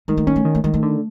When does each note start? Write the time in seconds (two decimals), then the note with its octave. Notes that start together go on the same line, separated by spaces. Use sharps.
0.08 D#3 G#3
0.17 A3
0.27 A#3 C#4
0.36 A3
0.45 D#3
0.55 A3
0.64 D#3 G#3
0.74 A3
0.83 D3